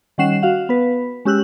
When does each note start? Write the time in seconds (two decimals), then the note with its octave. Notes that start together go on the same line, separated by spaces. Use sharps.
0.18 D#3 G3 C#4 F#5 C7 E7
0.42 F#4 F5 F#5
0.69 B3 B4
1.25 G#3 C#4 G4 E6 F#6 F#7